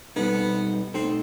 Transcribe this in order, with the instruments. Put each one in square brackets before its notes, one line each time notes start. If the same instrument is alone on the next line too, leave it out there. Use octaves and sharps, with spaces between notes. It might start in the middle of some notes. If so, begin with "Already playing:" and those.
[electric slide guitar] B2 G3 C4 D#4 A4 [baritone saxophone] B3
[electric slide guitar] B2 A3 D#4 A4 [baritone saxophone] C4